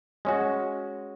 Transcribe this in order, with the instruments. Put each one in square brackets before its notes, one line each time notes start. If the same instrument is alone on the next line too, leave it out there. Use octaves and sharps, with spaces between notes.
[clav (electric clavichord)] G#3 C#4 F#4